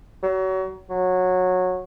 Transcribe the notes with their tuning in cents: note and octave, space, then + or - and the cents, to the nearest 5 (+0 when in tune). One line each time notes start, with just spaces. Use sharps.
F#3 +30
F#3 -15